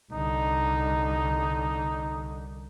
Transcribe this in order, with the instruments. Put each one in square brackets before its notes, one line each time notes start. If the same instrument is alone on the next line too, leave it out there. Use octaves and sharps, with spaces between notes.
[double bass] C2 D3 [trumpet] D#4